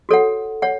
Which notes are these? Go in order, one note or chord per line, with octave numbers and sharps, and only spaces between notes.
F#4 A4 C#5 F#5
C#5 F#5